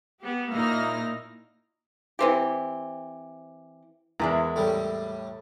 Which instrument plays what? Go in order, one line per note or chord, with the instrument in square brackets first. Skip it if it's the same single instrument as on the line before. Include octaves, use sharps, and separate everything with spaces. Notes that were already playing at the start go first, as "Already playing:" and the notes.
[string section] B3 G4
A#2 A#3 D#4 E4 F6 A#6
[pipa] E3 C4 G4
[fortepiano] E2 [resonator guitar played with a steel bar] G#3 E4 A#4
[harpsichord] A2 G3